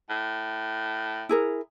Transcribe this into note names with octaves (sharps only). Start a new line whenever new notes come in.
A2
E4 G#4 A#4